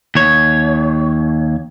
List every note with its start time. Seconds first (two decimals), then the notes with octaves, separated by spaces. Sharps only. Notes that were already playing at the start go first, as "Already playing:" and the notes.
0.15 D#2 C#5